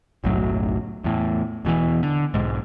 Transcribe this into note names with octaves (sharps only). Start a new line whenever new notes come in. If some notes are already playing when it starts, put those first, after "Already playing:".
F#1 B1 A2 F#3
E2 A2
E1 B2 D#3 E3
D3
B1 G#2